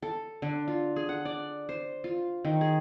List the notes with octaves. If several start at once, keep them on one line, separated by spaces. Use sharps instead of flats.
A4
D3
F4
G#4
F#5
D5
C5
F4
D#3
G#4